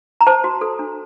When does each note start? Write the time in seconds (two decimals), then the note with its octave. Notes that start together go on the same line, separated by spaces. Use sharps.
0.21 A#5
0.27 C5 A5
0.44 F#4
0.61 A4
0.79 D4